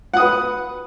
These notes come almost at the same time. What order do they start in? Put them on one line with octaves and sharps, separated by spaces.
F#5 D#6 B4